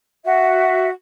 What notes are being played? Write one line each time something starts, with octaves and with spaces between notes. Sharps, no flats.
F#4 E5